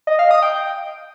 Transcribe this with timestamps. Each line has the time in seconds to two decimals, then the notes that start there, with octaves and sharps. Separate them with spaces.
0.07 D#5
0.19 F5
0.31 D#6
0.42 G5